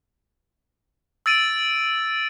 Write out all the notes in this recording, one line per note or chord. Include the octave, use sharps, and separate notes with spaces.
E6 A6 D7 D#7